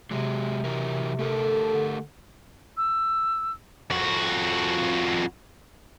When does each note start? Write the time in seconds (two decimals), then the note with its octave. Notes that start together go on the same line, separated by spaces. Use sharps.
0.11 C3 F#3 G#3
0.64 E3 F#3 A#4
1.19 A3 G4 A4 A#4
1.73 D3
2.77 E6
3.90 F2 F#4